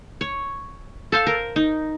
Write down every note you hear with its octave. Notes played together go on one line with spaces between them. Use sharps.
C#5
A4 C5 F5
A#4
D#4